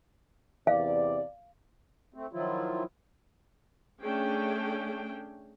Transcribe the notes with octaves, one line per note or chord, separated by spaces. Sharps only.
E2 C3 D5 F5
A3 C4
D#3 F3 F#3 E4 F4
A3 C#4 D4 G#4 G5